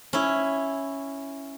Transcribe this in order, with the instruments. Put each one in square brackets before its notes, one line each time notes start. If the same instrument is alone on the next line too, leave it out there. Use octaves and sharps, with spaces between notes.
[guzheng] C#4 E4